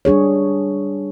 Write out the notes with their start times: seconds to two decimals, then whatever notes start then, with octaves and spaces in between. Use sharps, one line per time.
0.05 G3 D4 G#4 C#5